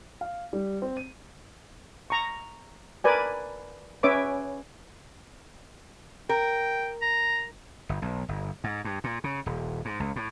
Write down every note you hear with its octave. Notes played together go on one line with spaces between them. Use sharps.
F5
G3
C4
D#7
A#5 C#6
A#4 B4 D5 G#5
C#4 B4 C#5 E5 D6 D#6
A#4 G5
A#5
G1
B1
G1
G#2
G2
A#2
C#3
D#1
G#2
C#2
A2